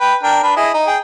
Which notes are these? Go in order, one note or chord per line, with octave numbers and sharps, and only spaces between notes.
B4 G5
D4 A#4 G5
D4 B4
E4 G#4 D#5
D#4
G#4 G5